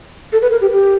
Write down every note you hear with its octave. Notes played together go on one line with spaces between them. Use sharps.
A4
B4
A#4
G4
G4